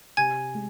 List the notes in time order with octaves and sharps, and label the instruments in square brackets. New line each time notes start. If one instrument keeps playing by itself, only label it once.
[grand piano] C3 [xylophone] G#5 G#6
[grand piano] G#3